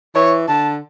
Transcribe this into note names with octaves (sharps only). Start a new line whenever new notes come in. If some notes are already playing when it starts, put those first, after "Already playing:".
E3 C#5
D3 A5